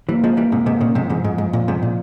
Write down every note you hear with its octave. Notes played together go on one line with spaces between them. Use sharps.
E3 G3 A#3
F3 G#3
E3 G3
G#2 C3
G#2 C3
A#2 C#3
G#2 C3 F3
G#2 C3 E3
F3
G#2
G#2
A#2
G#2 C3
A#2